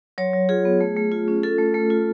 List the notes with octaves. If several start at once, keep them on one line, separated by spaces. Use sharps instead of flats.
F#3 C#5
F#3
F4 G#4
B3
A3
A3
F4
C#4
F4 A4
A3
A3
F4